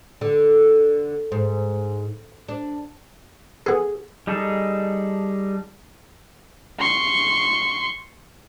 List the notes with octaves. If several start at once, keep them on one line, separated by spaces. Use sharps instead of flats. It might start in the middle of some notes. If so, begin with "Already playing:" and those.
D3
G#2
D4
B3 G#4 A4
G3 D#4 G#4 A4
C6 C#6